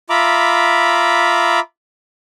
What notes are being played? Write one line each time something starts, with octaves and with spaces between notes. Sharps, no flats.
F4 E5 A#5 B5 D6